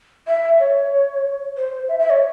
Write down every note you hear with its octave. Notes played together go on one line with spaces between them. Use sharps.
E5
C#5
C5
E5
E5
C#5